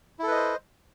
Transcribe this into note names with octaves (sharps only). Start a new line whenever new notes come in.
E4 A4 B4 C5 D#5